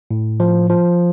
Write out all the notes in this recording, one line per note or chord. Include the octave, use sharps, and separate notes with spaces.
A2
F3
F3